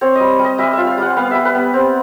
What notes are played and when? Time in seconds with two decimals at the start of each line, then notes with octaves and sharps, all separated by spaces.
0.01 C4 C#5
0.15 G3 D#5
0.39 G3
0.45 D#5
0.58 G3 E5
0.73 F4 E5
0.87 F5
0.98 G3 F#5
1.17 B3 F5
1.31 G3 E5
1.45 B4
1.55 B3
1.74 C4